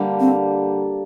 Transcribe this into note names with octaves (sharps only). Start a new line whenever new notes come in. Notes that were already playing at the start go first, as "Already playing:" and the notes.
Already playing: D3 G3 A#3
C4